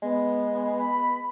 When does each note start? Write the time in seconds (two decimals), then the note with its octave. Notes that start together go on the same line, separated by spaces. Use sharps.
0.03 G#3 B3
0.78 B5